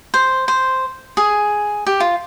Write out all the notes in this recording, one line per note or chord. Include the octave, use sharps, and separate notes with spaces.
C5
C5
G#4
G4
F4